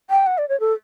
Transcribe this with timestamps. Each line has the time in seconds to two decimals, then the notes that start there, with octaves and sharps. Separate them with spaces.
0.10 G5
0.26 F#5
0.38 D5
0.49 C#5
0.60 A4